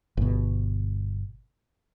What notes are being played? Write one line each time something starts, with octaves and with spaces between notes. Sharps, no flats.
G1 B2